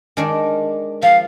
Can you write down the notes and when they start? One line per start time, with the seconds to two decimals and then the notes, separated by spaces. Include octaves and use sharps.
0.17 D#3 G#3 D4
1.02 F3 F5